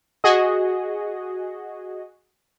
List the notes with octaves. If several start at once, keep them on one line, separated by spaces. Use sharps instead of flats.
F#4 G#4 D#5